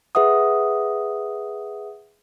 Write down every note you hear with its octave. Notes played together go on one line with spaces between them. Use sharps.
G#4 B4 E5 F#5 D#6